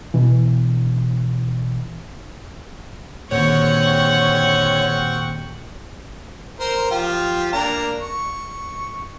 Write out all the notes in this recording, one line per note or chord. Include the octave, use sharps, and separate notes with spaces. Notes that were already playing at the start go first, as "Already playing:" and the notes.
B2 E3
D#1 D3 C4 F#4 C#5 F#5 G5 C#6
A#4 C5
F3 F4 G4
A#3 D4 A#5
C#6